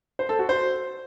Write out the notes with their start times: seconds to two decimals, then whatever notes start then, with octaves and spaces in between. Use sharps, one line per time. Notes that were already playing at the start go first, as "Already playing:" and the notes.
0.19 C5
0.29 A4
0.39 F#4
0.49 C5